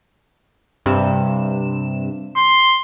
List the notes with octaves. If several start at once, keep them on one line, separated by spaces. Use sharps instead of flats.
G2 C3 E7
C6